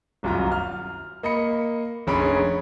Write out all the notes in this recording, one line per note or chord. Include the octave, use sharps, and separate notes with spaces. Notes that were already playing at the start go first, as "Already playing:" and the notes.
D#1 C2 F#2 F4 F#4 A#5
F6
A#3 D#5 B5 C#7
F1 A#1 C#4 G#4 B5 D7